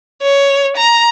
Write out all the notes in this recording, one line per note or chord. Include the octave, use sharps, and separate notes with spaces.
C#5
A#5